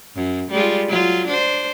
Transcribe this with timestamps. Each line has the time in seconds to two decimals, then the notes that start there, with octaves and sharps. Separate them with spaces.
0.15 F#2
0.51 G3 G#3 F4
0.88 F#3 F4
1.27 D4 C5